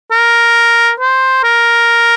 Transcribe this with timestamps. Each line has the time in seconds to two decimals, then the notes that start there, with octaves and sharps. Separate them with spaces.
0.11 A#4
1.00 C5
1.44 A#4